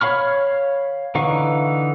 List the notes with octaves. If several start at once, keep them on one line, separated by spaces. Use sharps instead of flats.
C#5 F5 B5 C#6 F6
D3 E3 D#4 F5 C#6